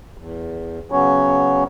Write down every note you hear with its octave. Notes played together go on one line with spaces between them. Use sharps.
E2
C#3 F#3 B3 C#4 C#5